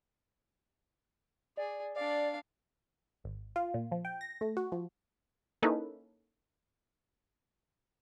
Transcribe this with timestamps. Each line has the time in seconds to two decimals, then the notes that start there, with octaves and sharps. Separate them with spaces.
1.57 G#4 D5
1.96 D4 D5 F5
3.24 G#1
3.56 F4
3.74 A#2
3.92 F3
4.05 G5
4.21 A#6
4.41 A3
4.57 F#4
4.72 F3
5.63 A#3 C#4 D#4 E4 A4 B4